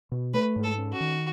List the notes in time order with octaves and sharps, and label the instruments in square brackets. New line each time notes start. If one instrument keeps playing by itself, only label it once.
[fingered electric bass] B2
[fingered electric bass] A3 [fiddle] B4
[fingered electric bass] G#2
[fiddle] A4
[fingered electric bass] C#4
[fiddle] F#4
[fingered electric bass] D#3